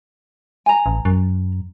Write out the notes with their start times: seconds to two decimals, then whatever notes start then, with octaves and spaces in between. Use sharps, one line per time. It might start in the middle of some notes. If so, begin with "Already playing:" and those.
0.66 G#5 A#5
0.86 A1
1.05 F#2